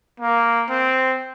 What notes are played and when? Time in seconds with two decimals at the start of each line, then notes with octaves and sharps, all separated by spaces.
0.20 A#3
0.69 C4